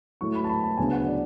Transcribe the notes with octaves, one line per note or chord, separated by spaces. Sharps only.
A2 F#3 A3 C#6
B5
A5
B5
A5
D2 C#3 F#3 B3 G#5
F#5
D5